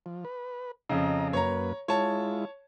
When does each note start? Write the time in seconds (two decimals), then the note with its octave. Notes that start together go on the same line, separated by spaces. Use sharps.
0.06 F3
0.25 B4
0.89 F2 C#3 D#5 A#5
1.33 F#2 A#3 B4 C#5 A#5
1.88 G#3 E4 F4 C#5 A5